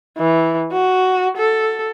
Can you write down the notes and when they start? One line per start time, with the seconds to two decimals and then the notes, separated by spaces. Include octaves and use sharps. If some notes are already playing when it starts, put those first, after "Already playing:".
0.18 E3
0.72 F#4
1.37 A4